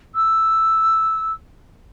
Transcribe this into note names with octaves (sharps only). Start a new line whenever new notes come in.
E6